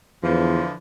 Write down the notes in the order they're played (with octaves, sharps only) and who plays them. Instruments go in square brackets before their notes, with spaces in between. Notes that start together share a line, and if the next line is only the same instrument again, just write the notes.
[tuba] E2 [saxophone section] D3 E3 F3